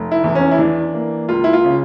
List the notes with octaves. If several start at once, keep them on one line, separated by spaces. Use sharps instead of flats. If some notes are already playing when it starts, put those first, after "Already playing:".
Already playing: F1
E4
E2
C#4
E4
E3 D4
A#3
C#2 F4
E4
F4
C#3